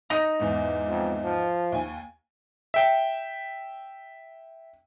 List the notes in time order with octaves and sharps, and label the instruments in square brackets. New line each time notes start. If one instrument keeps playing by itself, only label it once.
[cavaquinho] D#4 [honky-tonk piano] A#6
[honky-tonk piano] E2 G#2
[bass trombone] F2
F3
[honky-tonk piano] D#2 G#5
[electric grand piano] E5 G5